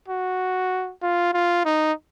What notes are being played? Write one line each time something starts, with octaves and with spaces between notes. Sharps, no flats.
F#4
F4
F4
D#4